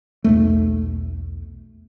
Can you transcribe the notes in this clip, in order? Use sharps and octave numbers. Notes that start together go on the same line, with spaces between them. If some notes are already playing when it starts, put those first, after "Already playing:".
B1 E2 A3